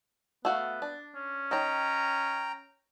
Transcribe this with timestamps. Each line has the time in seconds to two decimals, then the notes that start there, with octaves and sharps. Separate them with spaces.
0.45 A3 B3 F#4 F5
0.82 D4
1.15 C#4
1.51 D#3 C#5 G5 A#5